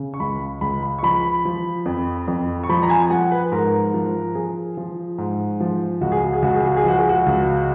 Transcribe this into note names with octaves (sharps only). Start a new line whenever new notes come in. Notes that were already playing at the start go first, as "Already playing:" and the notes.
Already playing: C#3
C#6
C#2 B5
C#2 B5
B5
C#6
F3 B5
F3
F2
F2
C#6
F3 B5
A#5
G#5
F3 F#5
B4
G#2 A#4
F3
F3 G#4
F3
G#2
F3
C#2 F#4
G#4
F#4
G#4
C#2 F#4
G#4
F#4
G#4
F3 F#4
G#4
F#4
C#2